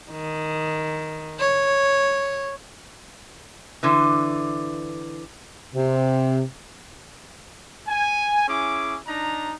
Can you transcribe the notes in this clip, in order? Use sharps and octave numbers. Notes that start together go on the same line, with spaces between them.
D#3
C#5
D3 E3
C3
G#5
C#4 E4 G#4 D6
D4 D#4 A#5